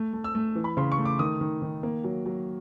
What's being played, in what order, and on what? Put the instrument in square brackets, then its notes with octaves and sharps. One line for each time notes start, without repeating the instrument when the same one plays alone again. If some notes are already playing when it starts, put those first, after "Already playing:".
Already playing: [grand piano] A3
A3
E6
A3
E3
B5
C#3 C6
C#6
A3
D6
D#3 D#6
D#3
D#3
A#3
F#3
F#3